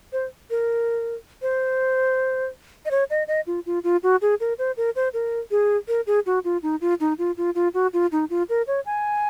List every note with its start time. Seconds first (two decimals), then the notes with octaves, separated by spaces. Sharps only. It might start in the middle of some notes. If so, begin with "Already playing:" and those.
0.13 C5
0.50 A#4
1.42 C5
2.85 D#5
2.91 C#5
3.10 D#5
3.28 D#5
3.47 F4
3.66 F4
3.84 F4
4.03 F#4
4.22 G#4
4.40 A#4
4.59 C5
4.77 A#4
4.96 C5
5.14 A#4
5.51 G#4
5.88 A#4
6.07 G#4
6.26 F#4
6.45 F4
6.63 D#4
6.81 F4
7.00 D#4
7.19 F4
7.37 F4
7.55 F4
7.74 F#4
7.93 F4
8.12 D#4
8.30 F4
8.49 A#4
8.67 C#5
8.86 G#5